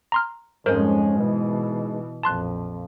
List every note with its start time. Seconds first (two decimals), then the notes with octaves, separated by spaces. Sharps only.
0.12 A#5 C6 F6
0.66 F2 G#2 G#3 C#4 A#4 C5
1.18 B2 E3
2.23 A#1 F2 A5 C6 F#6